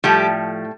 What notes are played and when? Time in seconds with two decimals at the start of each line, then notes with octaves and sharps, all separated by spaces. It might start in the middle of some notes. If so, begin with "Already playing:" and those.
0.04 A2 F3 G3 A3 G4